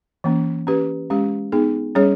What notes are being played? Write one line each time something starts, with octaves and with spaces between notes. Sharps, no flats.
E3 A#3 C#4
C#4 G4 B4
G#3 C#4 G4
B3 D#4 G#4
G3 C#4 G#4 C#5